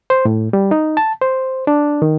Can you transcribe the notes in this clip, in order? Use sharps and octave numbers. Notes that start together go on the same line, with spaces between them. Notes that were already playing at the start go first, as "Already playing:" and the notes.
C5
A2
G3
D#4
A5
C5
D4
D#3